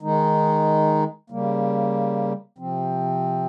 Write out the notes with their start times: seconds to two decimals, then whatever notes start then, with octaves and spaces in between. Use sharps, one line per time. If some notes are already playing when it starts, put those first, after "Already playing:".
0.01 D#3 G#3 D#4
1.30 C#3 G3 A#3
2.58 C3 F3 C4